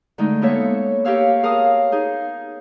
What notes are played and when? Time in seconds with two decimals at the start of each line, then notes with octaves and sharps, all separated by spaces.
0.18 D3 G#3 A3 D4 D#4
0.42 A#3 B3 A4 C#5 E5
1.05 G4 A#4 C#5 F5 E6
1.43 G#4 A#4 F5 A5 D#6
1.92 D#4 G#4